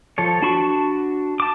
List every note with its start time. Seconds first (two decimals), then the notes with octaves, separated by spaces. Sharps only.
0.18 F3 A4 C#5
0.42 D4 F#4 A5 B5 C#6
1.40 A5 D6